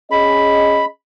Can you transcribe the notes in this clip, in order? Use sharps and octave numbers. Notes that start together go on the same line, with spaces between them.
C#4 G#4 D#5 B5